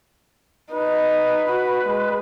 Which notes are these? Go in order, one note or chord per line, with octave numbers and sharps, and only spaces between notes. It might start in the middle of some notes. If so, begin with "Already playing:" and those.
D#4 B4
F#4
G#3